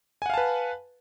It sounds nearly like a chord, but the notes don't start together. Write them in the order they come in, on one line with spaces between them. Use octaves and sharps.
G#5 F#5 F5 A5 B4